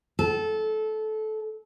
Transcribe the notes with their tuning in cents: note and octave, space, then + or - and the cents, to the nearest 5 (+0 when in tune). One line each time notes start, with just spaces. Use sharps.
A4 -20